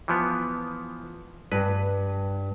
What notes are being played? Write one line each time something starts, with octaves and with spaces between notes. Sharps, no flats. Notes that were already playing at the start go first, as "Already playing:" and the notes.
E3 F3 B3
G2 B4